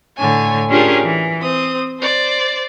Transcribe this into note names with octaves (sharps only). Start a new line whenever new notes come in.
A2 D3 C#5 G#5
C#4 D4 F4 G4 G#4 A#4
E3
C4 D#6
C5 D5